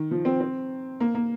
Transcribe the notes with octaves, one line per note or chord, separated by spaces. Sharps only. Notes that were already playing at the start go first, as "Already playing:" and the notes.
Already playing: D#3
F3
C4
C4
A#3
A#3